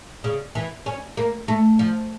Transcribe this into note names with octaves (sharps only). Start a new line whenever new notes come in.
C#3
E3
C#4
A#3
A3
F3